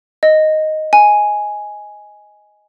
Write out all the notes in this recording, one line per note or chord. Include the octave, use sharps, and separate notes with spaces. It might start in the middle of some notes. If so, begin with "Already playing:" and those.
D#5
G#5